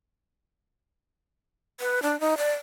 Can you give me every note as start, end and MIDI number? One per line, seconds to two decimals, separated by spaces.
1.80 2.02 71
2.02 2.19 62
2.20 2.37 63
2.38 2.53 74